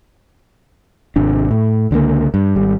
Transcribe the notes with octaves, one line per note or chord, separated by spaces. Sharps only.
G#1 C3 D4
A2
C#2 D3 F3 A#3
G2
G#1 G3